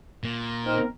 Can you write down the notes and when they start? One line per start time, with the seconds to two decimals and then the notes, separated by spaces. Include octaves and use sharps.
0.24 A#2
0.64 C4 D#4 A#4